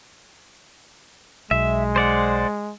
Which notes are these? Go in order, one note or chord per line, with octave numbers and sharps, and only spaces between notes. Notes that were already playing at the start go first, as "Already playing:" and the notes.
B1 G#3 E5
C5 D5 F#5